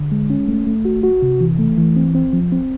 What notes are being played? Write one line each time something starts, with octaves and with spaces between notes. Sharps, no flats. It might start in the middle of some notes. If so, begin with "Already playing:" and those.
Already playing: D3
G#3
C#4
A3
A3
F#4
F#4
C3
E3
A3
E3
C4
C4
F3
C4